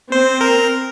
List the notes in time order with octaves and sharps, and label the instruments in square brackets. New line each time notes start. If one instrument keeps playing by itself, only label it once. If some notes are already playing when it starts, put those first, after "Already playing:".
[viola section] C4 [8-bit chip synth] C5
[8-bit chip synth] A#4